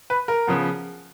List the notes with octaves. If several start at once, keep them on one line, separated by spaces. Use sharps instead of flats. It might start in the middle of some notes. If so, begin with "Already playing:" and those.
B4
A#4
C#3 F3 B3